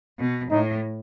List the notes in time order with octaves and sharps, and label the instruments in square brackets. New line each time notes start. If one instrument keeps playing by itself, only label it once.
[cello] B2
[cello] A2 [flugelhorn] D#4